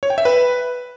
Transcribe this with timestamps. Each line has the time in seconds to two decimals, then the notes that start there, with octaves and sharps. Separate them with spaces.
0.03 C#5
0.10 G5
0.18 E5
0.25 B4